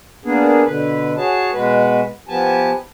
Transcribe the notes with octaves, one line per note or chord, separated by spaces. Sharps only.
A#3 B3 D4 G#4
B2 D3 B4
F#4 G#4 C#5 A5
B2 G#3 F#4 B4
F3 B3 G4 G#5 A5